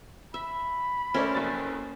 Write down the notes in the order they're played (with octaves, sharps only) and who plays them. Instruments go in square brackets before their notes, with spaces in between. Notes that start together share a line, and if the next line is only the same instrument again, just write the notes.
[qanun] E5 [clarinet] B5
[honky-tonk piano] A3 C5 D5 [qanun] C#4 A#4 E5
[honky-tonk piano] F#1 F2 A6